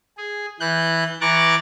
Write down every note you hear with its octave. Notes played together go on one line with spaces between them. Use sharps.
G#4
E3 F#6 G6
E3 A#5 C#6 D6 F#6 A6